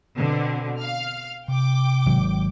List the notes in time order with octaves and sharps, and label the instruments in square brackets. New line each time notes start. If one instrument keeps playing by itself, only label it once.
[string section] B2 D3 C4
F5 F6
[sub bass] C3 [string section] G5 D6
[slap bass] G#1 F#3